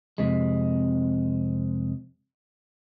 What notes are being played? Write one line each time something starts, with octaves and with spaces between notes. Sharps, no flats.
F2 G#2 C3 G#3